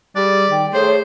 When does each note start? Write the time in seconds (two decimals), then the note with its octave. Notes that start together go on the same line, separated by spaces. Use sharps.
0.16 G3 G#4 D5
0.51 D#3 G5
0.73 A3 G#4 C5 C#5
0.86 C#5